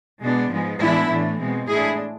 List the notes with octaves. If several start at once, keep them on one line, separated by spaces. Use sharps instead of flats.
B2 G#3 B3 D4
G#2 F3 G#3 B3
A2 E3 G#3 B3 D4 E4
A2 E3 A3 D4
B2 G#3 C4
A2 G#3 D4 E4 G#4